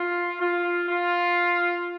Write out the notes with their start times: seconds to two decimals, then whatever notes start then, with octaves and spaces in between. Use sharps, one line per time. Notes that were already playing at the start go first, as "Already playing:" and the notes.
Already playing: F4
0.40 F4
0.88 F4